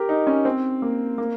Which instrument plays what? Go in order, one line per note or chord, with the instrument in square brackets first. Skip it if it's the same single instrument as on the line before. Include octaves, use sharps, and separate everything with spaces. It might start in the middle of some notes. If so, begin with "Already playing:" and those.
Already playing: [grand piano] G4 A#4
D#4
C#4
C4
A#3
A#3